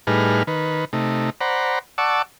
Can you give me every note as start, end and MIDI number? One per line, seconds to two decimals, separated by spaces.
0.07 0.43 45
0.07 0.43 55
0.07 0.43 63
0.07 0.43 68
0.07 0.43 71
0.07 0.43 89
0.47 0.85 51
0.47 0.85 71
0.93 1.30 48
0.93 1.30 57
0.93 1.30 63
1.41 1.79 72
1.41 1.79 74
1.41 1.79 78
1.41 1.79 82
1.41 1.79 83
1.98 2.22 74
1.98 2.22 78
1.98 2.22 81
1.98 2.22 85
1.98 2.22 86
1.98 2.22 88